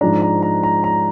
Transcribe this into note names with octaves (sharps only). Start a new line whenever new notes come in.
G#2 F3 G#3 D4 A#5
A#5
A#5
A#5
A#5